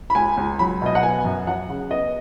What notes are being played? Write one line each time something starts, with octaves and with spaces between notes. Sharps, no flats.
B5
C#2 G#5
C#2
F#3 B5
B2 D#5
F#5
B3 G#5
F#2
F#3 F#5
C#3
B3 D#5